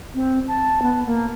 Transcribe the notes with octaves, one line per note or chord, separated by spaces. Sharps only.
C4
A5
B3
A#3